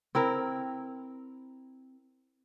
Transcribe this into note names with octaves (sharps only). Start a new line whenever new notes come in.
C4 E4 A#4